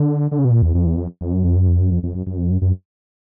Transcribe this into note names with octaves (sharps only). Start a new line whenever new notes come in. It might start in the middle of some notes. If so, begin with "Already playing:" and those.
Already playing: D3
D3
C#3
B2
A#2
E2
F2
E2
F2
F2
F#2
F2
F#2
F2
F#2
F2
F2
F#2
F#2
F2
F#2
F#2